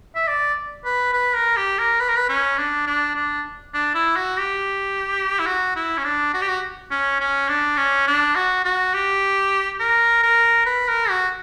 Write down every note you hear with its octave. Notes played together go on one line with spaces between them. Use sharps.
E5
D5
B4
B4
A#4
G4
A#4
B4
A#4
B4
C#4
D4
D4
D4
D4
E4
F#4
G4
E4
F#4
E4
C#4
D4
F#4
G4
F#4
C#4
C#4
D4
C#4
D4
F#4
F#4
G4
A#4
A#4
B4
A#4
F#4